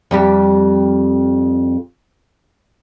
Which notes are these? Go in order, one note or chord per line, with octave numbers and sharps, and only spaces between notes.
F2 G3 G4